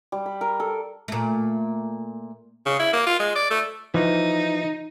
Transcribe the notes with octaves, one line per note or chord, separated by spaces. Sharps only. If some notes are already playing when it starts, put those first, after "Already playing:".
G3
B5
A#4
A4
A#2 A3
C#3
E4
A#3
F4
G#3
D5
A3
E3 F3 D#4